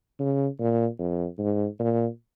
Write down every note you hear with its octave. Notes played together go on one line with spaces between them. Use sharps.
C#3
A#2
F2
G#2
A#2